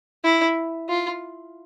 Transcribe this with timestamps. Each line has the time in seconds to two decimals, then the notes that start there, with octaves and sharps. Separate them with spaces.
0.24 E4
0.89 F4